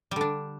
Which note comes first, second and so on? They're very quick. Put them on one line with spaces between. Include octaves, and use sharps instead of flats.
G3 D3 D4